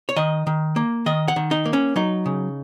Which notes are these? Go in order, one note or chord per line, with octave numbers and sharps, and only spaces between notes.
C#5
D#3 D#5
D#3
A#3
D#3 D#5
F#5
D#3
D#4
A#3
C#4
F#3 D#4
C#3